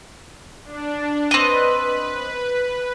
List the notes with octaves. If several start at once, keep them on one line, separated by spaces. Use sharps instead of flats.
D4
C4 B4 D#5